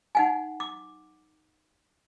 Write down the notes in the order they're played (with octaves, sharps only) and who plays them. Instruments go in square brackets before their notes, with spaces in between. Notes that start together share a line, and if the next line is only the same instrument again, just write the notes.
[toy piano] D#4 F#5 G#5
D6